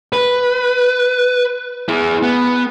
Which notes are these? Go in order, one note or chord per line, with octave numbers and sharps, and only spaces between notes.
B4
E4 G#4
B3